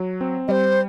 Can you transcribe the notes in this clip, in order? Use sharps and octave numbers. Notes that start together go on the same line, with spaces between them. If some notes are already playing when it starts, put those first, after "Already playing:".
Already playing: F#3
C4
G3 C5 D#5